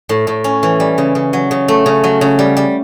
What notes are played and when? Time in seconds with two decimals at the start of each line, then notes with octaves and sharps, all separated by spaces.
0.09 A2
0.27 A2
0.44 C#4
0.63 E3
0.80 G3
0.98 C#3
1.15 C#3
1.33 F#3
1.51 C#3
1.68 A3
1.86 C#3
2.04 F#3
2.21 C#3
2.39 G3
2.57 G3